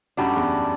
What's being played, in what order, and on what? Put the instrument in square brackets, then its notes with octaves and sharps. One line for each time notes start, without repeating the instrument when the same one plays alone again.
[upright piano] F#2 [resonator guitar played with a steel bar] A2 G3 D4 F#4
[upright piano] E2